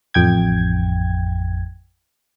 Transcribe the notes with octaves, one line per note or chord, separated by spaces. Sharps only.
A1 F2 G5 G#6